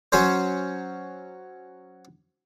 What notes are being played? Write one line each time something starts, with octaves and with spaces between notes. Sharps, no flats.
F#3 C#4 C5